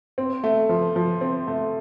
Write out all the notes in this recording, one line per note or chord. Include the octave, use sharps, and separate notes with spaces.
C4
A3
F3
F3
C4
A3